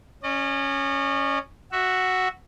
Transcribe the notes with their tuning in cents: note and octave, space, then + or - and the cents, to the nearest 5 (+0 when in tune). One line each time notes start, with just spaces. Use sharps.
C#4 +0 D#5 -45
F#4 +0 E5 +0